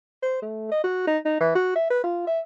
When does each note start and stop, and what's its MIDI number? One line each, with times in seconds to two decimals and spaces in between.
0.23 0.41 72
0.42 0.67 57
0.71 0.81 75
0.84 1.02 66
1.07 1.18 63
1.25 1.37 63
1.40 1.50 52
1.55 1.72 66
1.76 1.87 76
1.90 2.00 71
2.04 2.26 65
2.27 2.40 76